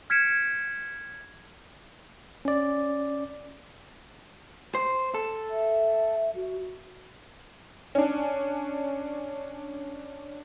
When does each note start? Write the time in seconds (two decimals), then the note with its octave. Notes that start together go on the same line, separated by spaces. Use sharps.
0.10 F6 G#6 B6 C#7 D7 E7
2.45 C#4 D5
4.75 C5
5.15 A4
5.50 E5
6.35 F#4
7.95 C#4 D4